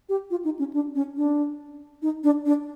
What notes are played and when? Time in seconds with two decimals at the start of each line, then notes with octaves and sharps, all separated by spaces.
0.09 G4
0.30 F4
0.44 D#4
0.59 C#4
0.73 D4
0.95 C#4
1.17 D4
2.02 D#4
2.23 D4
2.45 D4